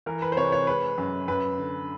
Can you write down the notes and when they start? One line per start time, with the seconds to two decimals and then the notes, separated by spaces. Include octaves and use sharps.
0.06 E3 A#4
0.22 B4
0.32 C5
0.37 C3 C#5
0.52 C#5
0.67 G#3 B4
0.98 F#2
1.28 F#2 B4
1.58 D3